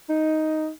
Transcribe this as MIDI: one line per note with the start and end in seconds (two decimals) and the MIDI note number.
0.09 0.69 63